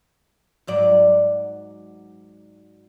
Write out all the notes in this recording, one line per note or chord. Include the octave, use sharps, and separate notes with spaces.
G#2 F#3 D5